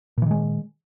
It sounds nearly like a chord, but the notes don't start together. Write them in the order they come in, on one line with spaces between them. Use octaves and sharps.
A#2 E3 D#3 G#3